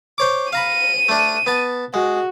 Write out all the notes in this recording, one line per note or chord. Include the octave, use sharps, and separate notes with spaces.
C5 C#5 D6
F5 A#5 B5 D#7
A3 D4
B3 A5
G#3 F#4